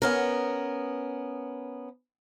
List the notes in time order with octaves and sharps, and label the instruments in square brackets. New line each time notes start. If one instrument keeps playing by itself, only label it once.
[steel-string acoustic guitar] B3 C#4 A#4